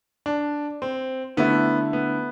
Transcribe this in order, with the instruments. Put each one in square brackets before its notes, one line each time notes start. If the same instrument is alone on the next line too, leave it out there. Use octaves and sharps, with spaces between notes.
[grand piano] D4
C4
[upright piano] D3 A3 E4 [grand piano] B3
[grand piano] B3